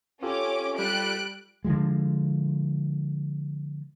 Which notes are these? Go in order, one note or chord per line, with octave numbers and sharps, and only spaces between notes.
C#4 F4 G4 A4 D6
G3 F#6 D7
D3 D#3 F3 G#3